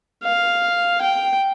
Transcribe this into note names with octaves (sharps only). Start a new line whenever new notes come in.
F5
G5